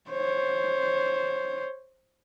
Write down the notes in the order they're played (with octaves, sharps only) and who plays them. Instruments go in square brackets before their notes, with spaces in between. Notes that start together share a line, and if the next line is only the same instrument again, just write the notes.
[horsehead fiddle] C5 C#5